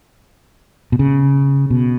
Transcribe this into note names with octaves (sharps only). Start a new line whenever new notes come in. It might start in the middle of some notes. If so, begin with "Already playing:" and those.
B2
C#3
B2